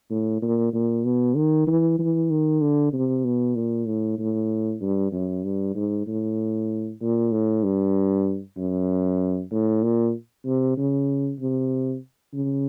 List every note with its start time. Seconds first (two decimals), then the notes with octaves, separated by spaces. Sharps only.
0.10 A2
0.42 A#2
0.73 A#2
1.05 B2
1.36 D#3
1.67 E3
1.99 E3
2.30 D#3
2.61 D3
2.93 C3
3.24 B2
3.56 A#2
3.87 A2
4.18 A2
4.81 G2
5.12 F#2
5.44 G2
5.75 G#2
6.07 A2
7.01 A#2
7.32 A2
7.63 G2
8.57 F#2
9.52 A2
9.83 A#2
10.46 C3
10.77 C#3
11.40 C3
12.34 C#3